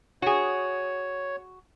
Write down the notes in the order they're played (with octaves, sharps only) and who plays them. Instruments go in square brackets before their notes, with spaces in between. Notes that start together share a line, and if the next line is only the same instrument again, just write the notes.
[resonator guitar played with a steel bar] F#4 G#4 [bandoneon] C#5